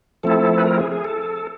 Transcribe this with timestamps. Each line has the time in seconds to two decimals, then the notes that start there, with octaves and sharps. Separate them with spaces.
0.23 F3 A3 C4 E4 A4
0.58 B4
0.64 A#4
0.77 G#4
0.92 G#4
1.04 A4